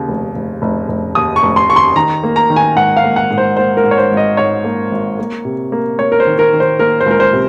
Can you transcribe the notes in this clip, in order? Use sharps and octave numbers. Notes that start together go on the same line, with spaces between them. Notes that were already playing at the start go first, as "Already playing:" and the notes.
Already playing: D#2 C#3
F1
F1
F1
F1
D#2 D#6
C#6
F1
C6
D#2 C#6
C6
D#3 A#5
A#3
A#5
D#3
G#5
G#2 F#5
F5
A#3
F#5
G#2
C5
A#3 C5
A#4
G#2
C#5
C5
G#1
D#5
G#2 C#5
A#3
G#1
A#3
C3
A#3
A#3 C#5
A#4
C5
D#3
A#4
D#3
C5
A#3 A#4
C5
C#2 A#4
C5
C3